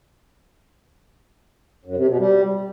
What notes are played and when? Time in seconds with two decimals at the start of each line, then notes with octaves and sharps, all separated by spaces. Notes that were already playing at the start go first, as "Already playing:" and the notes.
1.85 F#2
1.96 C3
2.08 B2
2.19 G3